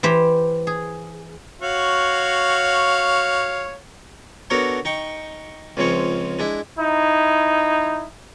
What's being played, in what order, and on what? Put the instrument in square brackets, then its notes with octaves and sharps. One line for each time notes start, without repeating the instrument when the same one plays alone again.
[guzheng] E3 G4 C5
G#4
[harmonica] F#4 C#5 F5
[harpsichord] B3 D4 F#4 A4 A#4 C#5
D#4 G5 C#6
C#2 C#3 F3 C4 C#5
G#3 D4 E4
[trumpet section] D#4 E4